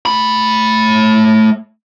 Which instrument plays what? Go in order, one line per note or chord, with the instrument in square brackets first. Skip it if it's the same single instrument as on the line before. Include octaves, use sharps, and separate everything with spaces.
[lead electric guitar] A3 B5